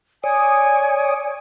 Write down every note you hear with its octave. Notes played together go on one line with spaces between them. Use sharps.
C#5 D5 G#5 D#6